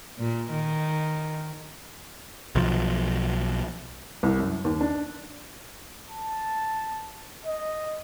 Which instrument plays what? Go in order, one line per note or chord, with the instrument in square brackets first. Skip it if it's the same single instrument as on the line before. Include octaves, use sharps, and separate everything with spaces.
[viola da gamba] A#2
D#3
[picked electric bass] B1 F3
[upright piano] C2
F#2
D#2
D4
[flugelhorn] A5
D#5